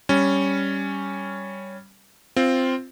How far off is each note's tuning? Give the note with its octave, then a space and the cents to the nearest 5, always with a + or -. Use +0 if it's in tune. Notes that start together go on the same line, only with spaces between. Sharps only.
G3 +0 C#4 +0
C4 +0 F4 +0